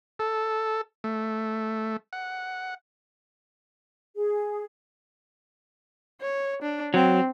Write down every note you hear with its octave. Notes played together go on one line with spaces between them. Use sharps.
A4
A3
F#5
G#4
C#5
D4
F#3 C4